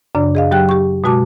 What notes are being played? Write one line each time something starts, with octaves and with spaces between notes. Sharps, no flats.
F#2 C#3 D4 D5
G#4 D#5 F5
F#3 G4 G5 F#6
G4 C#6
B2 G#3 F#4 A5 D6